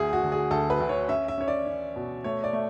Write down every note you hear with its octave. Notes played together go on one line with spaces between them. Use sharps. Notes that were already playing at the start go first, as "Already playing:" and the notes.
Already playing: D2 G#4
F#4
D3
G#4
D2 A4
B4
D2
C#5
C#4 E5
E5
C#4 C#5
D5
C#4
B2
A3 C#5
D5
A3